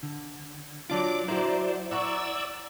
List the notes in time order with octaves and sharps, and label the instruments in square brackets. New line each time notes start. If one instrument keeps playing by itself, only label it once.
[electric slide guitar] D3
[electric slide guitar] F#3 D4 F4 [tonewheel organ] D6
[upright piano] F#3 A#5 [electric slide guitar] E4 [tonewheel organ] C5 D5
[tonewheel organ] D5 E6 [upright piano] F#5 A#5 C#6